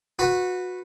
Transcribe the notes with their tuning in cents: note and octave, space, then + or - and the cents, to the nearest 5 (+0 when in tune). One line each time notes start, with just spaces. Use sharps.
F#4 -25 B4 +0